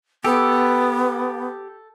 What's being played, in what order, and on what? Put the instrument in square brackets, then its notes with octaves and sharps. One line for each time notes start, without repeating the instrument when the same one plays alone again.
[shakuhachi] B3 [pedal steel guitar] G4 [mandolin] A4